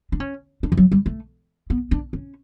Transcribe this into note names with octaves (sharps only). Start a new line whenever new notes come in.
D4
C#4
D4
E3
F#3
G3
A3
B3
D4
C#4